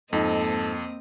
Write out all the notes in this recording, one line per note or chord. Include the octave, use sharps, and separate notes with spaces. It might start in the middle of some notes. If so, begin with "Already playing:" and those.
F2 G#2 A#3 C4 D#4 A4 D#5